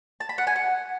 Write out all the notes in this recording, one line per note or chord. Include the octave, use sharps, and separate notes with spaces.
A5
B5
F#5
G#5
F#5